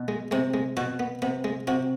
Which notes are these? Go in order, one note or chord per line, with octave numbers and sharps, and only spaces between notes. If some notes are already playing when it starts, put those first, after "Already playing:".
Already playing: B2
G#3
C3 G#3
G#3
B2 F#4
B3
C3 B3
G#3
C3 F#4